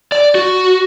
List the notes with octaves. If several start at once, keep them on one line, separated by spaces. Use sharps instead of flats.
D5
F#4